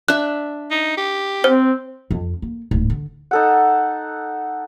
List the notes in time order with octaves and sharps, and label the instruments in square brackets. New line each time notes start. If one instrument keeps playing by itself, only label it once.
[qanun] D4 E5 [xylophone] F#6
[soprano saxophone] D#4
G4
[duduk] C4 [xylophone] C5
[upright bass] F2
A#3
D1 G#2
D3
[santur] D#4 A4 F#5